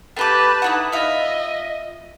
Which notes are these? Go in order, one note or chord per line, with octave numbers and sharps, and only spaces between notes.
A3 G4 B4 A5 D6
D#4 E4 F#5
F4 D#5 E5